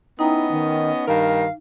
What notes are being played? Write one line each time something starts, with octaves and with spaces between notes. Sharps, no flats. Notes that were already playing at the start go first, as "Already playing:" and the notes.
B3 C#4 D#4 E4 D#5 G5 A#5
D#3
G2 D#3 A#4 F5